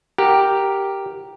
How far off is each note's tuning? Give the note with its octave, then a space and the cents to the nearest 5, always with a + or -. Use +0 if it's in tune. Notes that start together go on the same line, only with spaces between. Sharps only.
G4 +0 A#4 +0 F#5 -10